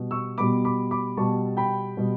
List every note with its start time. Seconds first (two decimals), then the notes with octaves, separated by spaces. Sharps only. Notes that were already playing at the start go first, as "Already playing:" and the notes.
Already playing: B2 G3 B3
0.11 C#6 E6
0.38 B2 G3 B3 B5 D6
0.65 B5 D6
0.91 B5 D6
1.17 B2 G3 B3 A5 C#6
1.57 G5 B5
1.97 B2 G3 B3